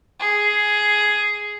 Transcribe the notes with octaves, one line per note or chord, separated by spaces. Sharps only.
G#4